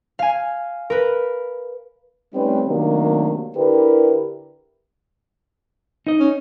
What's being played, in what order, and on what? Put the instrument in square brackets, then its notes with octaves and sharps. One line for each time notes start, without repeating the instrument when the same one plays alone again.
[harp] F5 G#5
A#4 B4
[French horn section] G3 A3 C4 C#4 D#4 B4
C3 D#3 F#3 A3 A#3 D4
D3 E4 G4 A#4 B4
[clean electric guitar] D#4 D#5
[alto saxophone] C#4